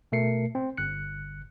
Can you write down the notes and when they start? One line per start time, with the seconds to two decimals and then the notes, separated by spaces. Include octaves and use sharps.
0.12 B2 A3 A#4 C7 C#7
0.55 C4
0.77 G1 F#6 C#7